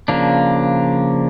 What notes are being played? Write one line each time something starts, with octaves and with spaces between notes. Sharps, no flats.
C#3 F3 A#3 D4